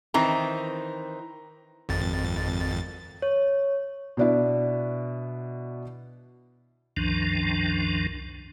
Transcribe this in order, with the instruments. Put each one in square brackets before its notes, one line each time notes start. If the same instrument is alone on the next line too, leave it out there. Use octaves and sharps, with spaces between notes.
[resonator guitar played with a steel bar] D#3 E3 C4 [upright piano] A#5
[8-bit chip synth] G#1 F2 A6
[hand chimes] C#5
[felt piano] B2 D4 E4
[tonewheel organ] C2 F#2 D#3 F3 D4